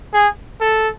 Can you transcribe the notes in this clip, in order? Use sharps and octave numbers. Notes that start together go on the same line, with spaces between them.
G#4
A4